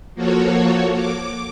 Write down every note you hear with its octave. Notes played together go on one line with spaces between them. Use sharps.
F3 A#3 F#4 A4 C#5
D6